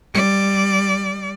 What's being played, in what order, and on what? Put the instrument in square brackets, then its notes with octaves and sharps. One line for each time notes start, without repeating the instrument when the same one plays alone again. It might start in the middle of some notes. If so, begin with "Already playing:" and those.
[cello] G3 D5